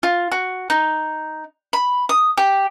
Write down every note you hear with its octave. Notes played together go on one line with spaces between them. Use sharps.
F4
F#4
D#4
B5
D#6
G4